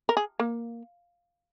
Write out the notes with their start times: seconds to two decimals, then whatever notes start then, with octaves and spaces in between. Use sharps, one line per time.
0.09 A#4
0.17 G#4
0.39 A#3